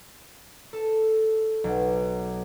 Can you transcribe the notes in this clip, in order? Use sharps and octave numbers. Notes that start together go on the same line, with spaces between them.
A4
B1